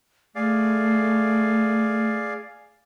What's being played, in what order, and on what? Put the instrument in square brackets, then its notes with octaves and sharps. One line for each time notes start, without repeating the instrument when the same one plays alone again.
[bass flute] A3 [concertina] G#4 D5 F5